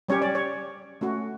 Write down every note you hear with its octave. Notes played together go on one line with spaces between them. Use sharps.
G3 C#4 G4 C#5
D5
C#5
A3 C#4 F#4